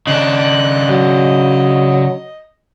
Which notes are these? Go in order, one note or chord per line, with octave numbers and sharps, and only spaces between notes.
C#3 D4 D#5 F#6
F#3